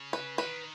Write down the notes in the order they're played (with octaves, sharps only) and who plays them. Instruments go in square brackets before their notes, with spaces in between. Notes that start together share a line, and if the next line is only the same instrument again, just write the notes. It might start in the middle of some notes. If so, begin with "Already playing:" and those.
Already playing: [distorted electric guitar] C#3
[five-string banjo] B4
[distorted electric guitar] D#3 [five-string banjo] B4